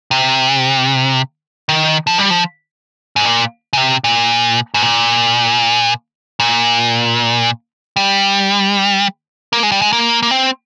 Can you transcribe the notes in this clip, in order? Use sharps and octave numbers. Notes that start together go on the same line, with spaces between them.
C3
D#3
F3
G3
F3
G#2
A#2
C#3
C3
A#2
G#2
A#2
A#2
G3
A#3
G#3
G3
G#3
A#3
A#3
C4